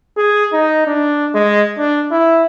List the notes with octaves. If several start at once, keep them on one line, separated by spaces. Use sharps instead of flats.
G#4
D#4
D4
G#3
D4
E4